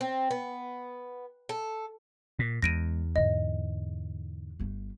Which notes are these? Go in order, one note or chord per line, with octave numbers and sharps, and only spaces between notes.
C4
B3
A4
A#2
E2 E3 G#3 A#6 D7 D#7
G#2 D3 D#5
G1 A3